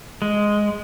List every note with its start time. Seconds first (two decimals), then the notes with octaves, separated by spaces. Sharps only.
0.22 G#3